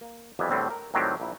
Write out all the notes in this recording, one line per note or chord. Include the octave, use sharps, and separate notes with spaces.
A#3
F2 E3 G3 B3 G#4 E5
E2 A2 D3 G3 C4
A#4
A2 D#3 F#3 G3 C4 G4
A#1 A#3 E4